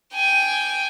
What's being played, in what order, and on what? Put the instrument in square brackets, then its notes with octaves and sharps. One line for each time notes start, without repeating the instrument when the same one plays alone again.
[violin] G5 G#5